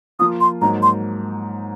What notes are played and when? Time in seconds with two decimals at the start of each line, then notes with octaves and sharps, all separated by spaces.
0.19 F3 A#3 F4 D#6
0.41 C6
0.61 G#2 F#3 A#3 D#4 A#5
0.82 C6